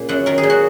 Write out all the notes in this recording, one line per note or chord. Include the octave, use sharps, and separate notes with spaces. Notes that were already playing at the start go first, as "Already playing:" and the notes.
Already playing: A#2 C#3
F#2 F#5
D#3 A#4
G#4
A#2
F#4